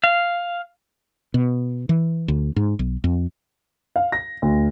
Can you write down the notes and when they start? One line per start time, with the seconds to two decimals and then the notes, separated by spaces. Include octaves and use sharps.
0.04 F5
1.34 B2
1.89 E3
2.28 D2
2.56 G#2
2.79 B1
3.04 F2
3.96 F5
4.12 A#6
4.42 D2